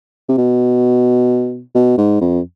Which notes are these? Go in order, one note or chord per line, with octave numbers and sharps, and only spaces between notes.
C3
B2
B2
G#2
F2